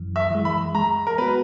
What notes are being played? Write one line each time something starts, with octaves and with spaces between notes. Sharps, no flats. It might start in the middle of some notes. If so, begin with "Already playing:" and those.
Already playing: F#2 E3
E5
E3 G#3
B5
G#3 A#5
A#4
B3 F#4 B4